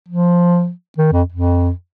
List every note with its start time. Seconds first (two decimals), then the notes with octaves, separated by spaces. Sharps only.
0.08 F3
0.98 D#3
1.12 F2
1.32 F2